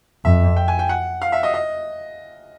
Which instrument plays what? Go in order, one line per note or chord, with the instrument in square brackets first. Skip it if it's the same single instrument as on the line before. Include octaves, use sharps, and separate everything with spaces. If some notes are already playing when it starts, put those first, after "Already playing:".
[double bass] F2 [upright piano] E5
[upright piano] G5
G#5
G5
F#5
F5
E5
D#5
D#5